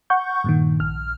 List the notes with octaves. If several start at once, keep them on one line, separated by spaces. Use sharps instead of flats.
F#5 C#6 G6
G2 A#2 D#3
A#1 F6